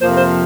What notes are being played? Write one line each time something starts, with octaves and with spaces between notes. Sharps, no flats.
F2 C3 F3 A#3 C5
C5